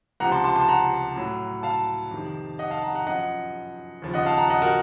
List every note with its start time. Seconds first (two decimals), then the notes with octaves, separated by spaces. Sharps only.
0.20 C#2 C3 F3 F#5 A#5
0.32 A5 C6
0.44 A5 C6
0.56 A5 C6
0.68 F#5 A#5
1.16 A2 F#3
1.63 F5 A5
2.11 F2 C3 D#3
2.59 D#5 F#5
2.71 F5 A5
2.83 F#5 A#5
2.95 F#5 A#5
3.06 F#2 F3 D#5 F#5
4.02 D#2 C#3 F3
4.14 D#5 F#5
4.26 F5 A5
4.38 F#5 A#5
4.50 D#5 F#5
4.62 F#4 A#4